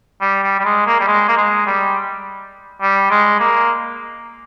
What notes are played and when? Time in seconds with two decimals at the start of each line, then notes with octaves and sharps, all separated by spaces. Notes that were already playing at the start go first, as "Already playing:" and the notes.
0.21 G3
0.43 G3
0.59 G3
0.65 G#3
0.86 A#3
1.00 G3
1.07 G#3
1.28 A#3
1.37 G#3
1.66 G3
2.81 G3
3.10 G#3
3.40 A#3